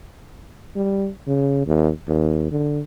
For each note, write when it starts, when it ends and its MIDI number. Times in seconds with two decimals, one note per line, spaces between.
0.76 1.09 55
1.27 1.63 49
1.67 1.91 39
2.07 2.48 39
2.51 2.81 50